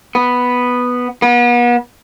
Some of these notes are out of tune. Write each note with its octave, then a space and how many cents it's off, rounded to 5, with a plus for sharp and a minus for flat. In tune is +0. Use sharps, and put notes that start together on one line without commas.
B3 +0
B3 -40